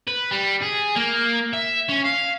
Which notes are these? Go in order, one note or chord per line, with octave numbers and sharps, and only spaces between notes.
B4
G3
G#4
A#3
E5
C#4
F5